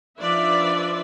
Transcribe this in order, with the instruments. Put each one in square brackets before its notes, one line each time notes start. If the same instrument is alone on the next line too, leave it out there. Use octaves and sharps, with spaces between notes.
[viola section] F3 D4 D#4 B4 D5 E5